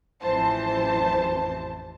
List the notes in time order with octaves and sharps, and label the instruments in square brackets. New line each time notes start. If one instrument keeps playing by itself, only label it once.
[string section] A1 F2 E3 C5 A5